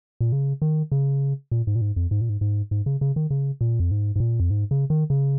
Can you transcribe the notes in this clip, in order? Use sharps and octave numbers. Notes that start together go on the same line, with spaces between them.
A#2
C#3
D#3
C#3
A#2
G#2
A#2
G#2
F2
G#2
A#2
G#2
G#2
G#2
C#3
C#3
D#3
C#3
A#2
F2
G#2
G#2
A#2
F2
G#2
C#3
D#3
C#3